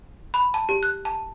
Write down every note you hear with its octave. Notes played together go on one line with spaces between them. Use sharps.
B5
A5
G4
F#6
A5